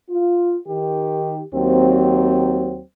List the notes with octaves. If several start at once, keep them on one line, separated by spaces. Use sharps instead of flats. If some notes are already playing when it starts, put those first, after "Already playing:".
F4
D#3 G4
D#2 F#3 C4